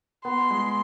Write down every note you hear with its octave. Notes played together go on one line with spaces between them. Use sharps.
B3 C6
G#3